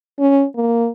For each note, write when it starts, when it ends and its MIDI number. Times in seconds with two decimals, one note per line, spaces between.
0.20 0.44 61
0.56 0.89 58